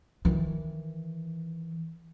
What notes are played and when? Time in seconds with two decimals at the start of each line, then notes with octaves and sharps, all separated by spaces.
0.25 D#3 E3